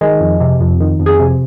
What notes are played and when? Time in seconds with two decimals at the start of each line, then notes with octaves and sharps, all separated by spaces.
0.01 D#3 G#3
0.20 F2
0.40 C3
0.60 F2
0.80 D#3
1.00 F2
1.06 G#4
1.19 C3